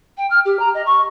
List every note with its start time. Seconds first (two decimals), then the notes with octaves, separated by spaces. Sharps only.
0.17 G5
0.30 F6
0.45 G4
0.59 A#5
0.74 D#5
0.86 C#6